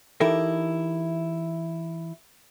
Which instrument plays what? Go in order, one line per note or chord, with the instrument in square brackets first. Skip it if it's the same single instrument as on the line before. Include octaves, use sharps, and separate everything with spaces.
[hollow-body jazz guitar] E3 D#4 E4 G4 A4 A#4